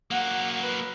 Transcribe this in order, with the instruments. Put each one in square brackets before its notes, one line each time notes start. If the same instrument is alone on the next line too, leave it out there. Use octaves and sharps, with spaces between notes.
[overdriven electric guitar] F#3 A#3 [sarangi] F#5
[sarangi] B4